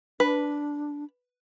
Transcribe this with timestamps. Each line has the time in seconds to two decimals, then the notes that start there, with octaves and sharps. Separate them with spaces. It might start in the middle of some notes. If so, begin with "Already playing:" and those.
0.20 D4 B4